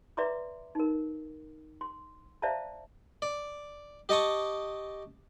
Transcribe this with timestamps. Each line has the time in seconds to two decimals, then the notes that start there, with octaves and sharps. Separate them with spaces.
0.17 B4 D5 E5 A#5 C6 D6
0.75 D#4 A#4
1.81 C6
2.42 C5 D5 E5 F5 A5 A#5
3.22 D5
4.09 G4 D#5 A5 C#6 D#6